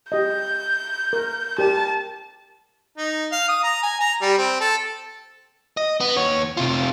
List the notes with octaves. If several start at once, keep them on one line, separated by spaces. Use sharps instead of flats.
G4 D#5 G6
A#4
G4 A#4 D5 A5
D#4
F5
D#6
A#5
G#5
A#5
G3
C4
A4
D#5
B3
D#2 C#5
C3 F4